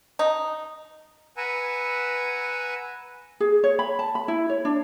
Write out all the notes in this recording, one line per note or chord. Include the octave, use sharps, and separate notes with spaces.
D#4
B4 F#5 G#5 A#5 E6
G#4
C#5
B5
A5
B5
E4
C#5
D4